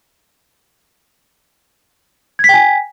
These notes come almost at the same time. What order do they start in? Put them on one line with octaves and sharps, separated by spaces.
G#6 B6 G5 G#5